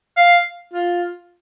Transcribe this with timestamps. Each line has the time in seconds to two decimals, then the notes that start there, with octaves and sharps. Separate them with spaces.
0.17 F5
0.73 F4